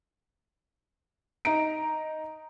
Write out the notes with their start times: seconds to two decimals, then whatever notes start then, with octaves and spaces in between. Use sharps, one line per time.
1.45 D#4 A#5 D7